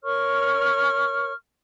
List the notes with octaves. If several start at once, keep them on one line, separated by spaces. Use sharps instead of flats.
A#4 C#5 C#6 F6